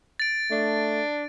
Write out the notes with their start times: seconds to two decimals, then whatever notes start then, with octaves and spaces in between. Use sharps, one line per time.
0.20 A6 D7
0.51 A3 D4